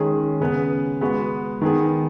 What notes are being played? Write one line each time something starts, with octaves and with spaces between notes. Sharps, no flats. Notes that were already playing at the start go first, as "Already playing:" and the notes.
Already playing: D#3 G#3 C#4 G#4
C#3 B3 G#4 B4
G#3 B3 F#4 B4
D#3 B3 G#4